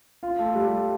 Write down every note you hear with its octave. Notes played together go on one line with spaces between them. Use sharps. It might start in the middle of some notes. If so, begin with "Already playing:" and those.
F4
A3
G3